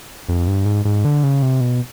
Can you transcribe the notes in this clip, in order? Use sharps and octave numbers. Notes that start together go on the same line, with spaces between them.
F2
G2
G#2
G#2
D3
C#3
C3
B2